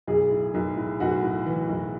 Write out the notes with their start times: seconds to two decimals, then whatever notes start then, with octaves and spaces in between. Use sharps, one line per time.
0.07 B1 G#4
0.30 A2
0.54 B1
0.77 A2
1.00 B1 F#4
1.23 A2
1.46 E3
1.69 B1